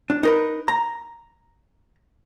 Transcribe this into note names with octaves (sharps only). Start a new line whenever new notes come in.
D4
D#4 A#4 B4
A#5